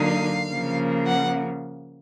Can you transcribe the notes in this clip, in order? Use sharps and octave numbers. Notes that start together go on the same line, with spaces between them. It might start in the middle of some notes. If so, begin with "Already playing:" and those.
Already playing: D3 F#3 A#3 D#4 F5
C#3 F3 A#3
F#5